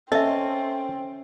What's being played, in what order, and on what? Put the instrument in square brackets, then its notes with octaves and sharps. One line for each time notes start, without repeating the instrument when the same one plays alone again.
[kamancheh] C4 [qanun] C#4 C6 [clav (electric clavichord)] A4 [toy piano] D#5 E5